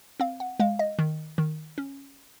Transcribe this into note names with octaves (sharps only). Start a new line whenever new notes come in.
C4 F5
F#5
G#3 F5
D#5
D#3
D#3
C#4